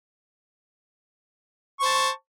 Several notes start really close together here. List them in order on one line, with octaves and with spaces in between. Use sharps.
C#6 C5 A5